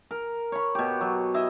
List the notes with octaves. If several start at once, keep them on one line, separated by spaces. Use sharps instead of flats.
A#4
C#5 B5
B2 G4
F#3
E4 D#5 E5